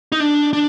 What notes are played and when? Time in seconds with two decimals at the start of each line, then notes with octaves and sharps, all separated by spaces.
0.12 D#4
0.20 D4
0.53 D4